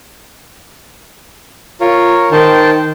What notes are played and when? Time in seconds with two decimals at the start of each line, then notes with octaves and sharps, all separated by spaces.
1.81 F4 A#4 C#5
2.32 D#3 C5 G5 A5